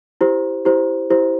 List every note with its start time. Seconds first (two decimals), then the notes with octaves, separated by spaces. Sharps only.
0.21 E4 G4 C5
0.65 E4 G4 C5
1.10 E4 G4 C5